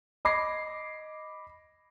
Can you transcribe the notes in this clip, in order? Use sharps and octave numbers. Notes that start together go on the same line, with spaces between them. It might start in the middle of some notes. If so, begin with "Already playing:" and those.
D#5 B5 D6 G#6 A#6 C7